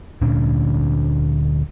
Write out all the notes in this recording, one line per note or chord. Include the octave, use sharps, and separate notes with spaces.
D2 A#2 C#4 D4